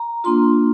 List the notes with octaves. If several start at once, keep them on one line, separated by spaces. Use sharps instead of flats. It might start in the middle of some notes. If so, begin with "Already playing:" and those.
Already playing: A#5
A#3 D4 F4 C6